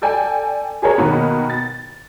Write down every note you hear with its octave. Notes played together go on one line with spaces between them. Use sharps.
A4 D5 G5 G#5
G4 G#4 A#4 C#5
B2 D#3 A#3 B3
A6